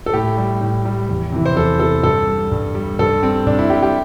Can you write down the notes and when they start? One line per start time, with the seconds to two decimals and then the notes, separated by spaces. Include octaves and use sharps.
0.06 A4
0.13 A2 G4
0.38 G3
0.61 A2
0.85 G3
1.09 E2
1.32 C3 E3
1.46 C5
1.56 E2 A4
1.80 C3 E3 A4
2.03 G2 A4
2.27 G3
2.52 G2
2.75 G3
2.99 G2 A4
3.22 G3 C4
3.46 G2 D4
3.59 E4
3.70 G3 G4
3.83 G4